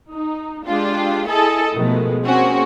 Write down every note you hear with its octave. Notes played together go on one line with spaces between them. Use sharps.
D#4
G#3 D4 F4 G4
E4 G#4 A4 D#5
B2 D#3 F3 G#3 A3 B3
A#3 C4 C#4 F#4 G#4